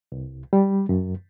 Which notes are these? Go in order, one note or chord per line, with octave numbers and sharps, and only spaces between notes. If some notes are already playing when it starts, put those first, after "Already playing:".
C2
G3
F#2